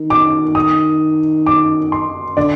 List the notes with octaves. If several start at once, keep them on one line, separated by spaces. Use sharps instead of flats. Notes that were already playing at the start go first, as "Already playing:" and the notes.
Already playing: D#3
D6
D#6
D6
C6
D3 D5